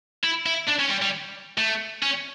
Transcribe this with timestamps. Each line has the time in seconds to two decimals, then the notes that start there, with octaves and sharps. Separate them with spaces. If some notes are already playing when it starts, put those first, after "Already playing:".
0.24 E4
0.46 E4
0.68 D4
0.80 C#4
0.91 G3
1.02 G3
1.58 A3
2.03 C#4